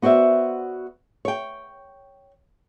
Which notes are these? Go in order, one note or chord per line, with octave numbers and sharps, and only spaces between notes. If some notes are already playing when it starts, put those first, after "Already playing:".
B3 F#4 C5 D5 E5
C#5 G5